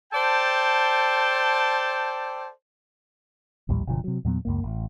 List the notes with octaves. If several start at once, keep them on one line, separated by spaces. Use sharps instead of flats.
A4 C5 D5 G5 A5
A#1 D#2 A2 G3
F#1 B2 D3 F3
C3 F#3
E2 A#2 F#3 B3
C#2 F#2 A#3
A1